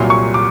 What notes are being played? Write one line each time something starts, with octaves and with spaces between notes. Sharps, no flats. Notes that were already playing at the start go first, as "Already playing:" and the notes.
Already playing: C2 A#2 F#3 C6
C#6
D6